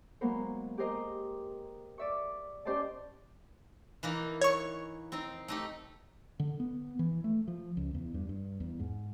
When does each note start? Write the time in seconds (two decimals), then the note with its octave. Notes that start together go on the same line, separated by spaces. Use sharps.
0.21 F#3 G#3 A#3 B3 A#4 C5
0.78 G4 G#4 A#4 C5 D#5
1.98 D5 E5 C#6
2.65 C#4 G4 C5 D5 D#5 A5
4.03 E3 A#3 D#4
4.41 C#5 C#6
5.12 C4 D#4
5.48 A3 D#4 G4
6.40 D3
6.60 B3
6.99 E3
7.24 A3
7.48 F3
7.77 C#2
7.94 E2
8.14 G2
8.29 G2
8.60 E2
8.79 G#2